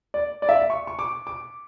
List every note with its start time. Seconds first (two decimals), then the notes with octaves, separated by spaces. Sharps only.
0.14 D5
0.42 D5
0.49 E5
0.56 D5
0.70 C#6
0.87 C#6
0.99 D6
1.27 D6